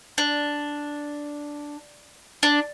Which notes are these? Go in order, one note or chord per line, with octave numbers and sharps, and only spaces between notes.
D4
D4